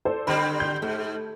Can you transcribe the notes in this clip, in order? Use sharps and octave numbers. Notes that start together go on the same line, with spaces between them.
A4 C5 D5
D3 G3 C4 B5
G6
G#2 A3